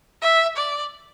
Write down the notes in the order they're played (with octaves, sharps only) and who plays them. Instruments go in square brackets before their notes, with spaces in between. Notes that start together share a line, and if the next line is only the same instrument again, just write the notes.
[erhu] E5
D5